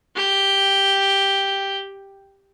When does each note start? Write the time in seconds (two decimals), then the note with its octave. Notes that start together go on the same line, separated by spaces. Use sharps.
0.15 G4 G5